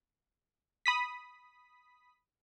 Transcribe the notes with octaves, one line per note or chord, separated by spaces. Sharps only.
B5 D#6 B6